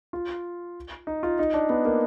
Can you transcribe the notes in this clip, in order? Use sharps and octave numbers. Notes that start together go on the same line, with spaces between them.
F4
D#4
F4
D#4
D4
B3
A#3